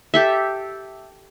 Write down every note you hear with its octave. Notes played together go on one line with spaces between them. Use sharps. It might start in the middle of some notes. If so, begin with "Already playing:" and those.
G4 A4 E5